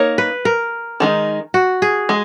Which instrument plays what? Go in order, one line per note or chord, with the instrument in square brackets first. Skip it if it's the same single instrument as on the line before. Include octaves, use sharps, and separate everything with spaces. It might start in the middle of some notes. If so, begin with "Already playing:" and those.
Already playing: [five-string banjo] A#3 D#4 A#4 C#5
[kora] B4
A#4
[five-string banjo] D#3 G#3 D#4
[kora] F#4
G#4
[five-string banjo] G#3